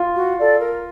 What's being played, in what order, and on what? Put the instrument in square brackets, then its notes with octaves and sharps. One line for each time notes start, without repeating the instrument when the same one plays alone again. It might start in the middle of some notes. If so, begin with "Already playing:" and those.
Already playing: [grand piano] F4
[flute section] F#4
A4 D5
A#4